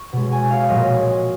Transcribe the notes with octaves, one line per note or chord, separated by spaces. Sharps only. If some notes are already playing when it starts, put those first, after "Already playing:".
Already playing: C#6
B2 G#3
G#5
F5
A#2 F#3 D#5